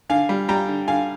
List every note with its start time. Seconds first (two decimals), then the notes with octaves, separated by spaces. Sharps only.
0.10 D3 F5 G#5
0.29 G3
0.48 G3 G5 A#5
0.68 D3
0.88 D3 F5 G#5